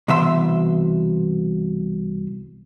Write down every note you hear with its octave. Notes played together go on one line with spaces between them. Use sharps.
C2 B2 E3 C5 E5 C6